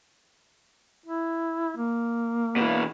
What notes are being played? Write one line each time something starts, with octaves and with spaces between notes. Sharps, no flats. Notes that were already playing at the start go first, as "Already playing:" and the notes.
E4
A#3
B2 E3